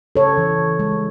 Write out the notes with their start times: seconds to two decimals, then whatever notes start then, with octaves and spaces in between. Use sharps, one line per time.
0.16 C#3 A4 C#5
0.38 E3
0.58 C#3
0.79 G#3